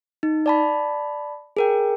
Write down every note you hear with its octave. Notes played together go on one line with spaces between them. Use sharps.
D#4
D5 A5 B5
G#4 A#4 G5